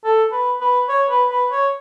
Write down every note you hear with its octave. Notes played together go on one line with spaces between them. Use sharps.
A4
B4
B4
C#5
B4
B4
C#5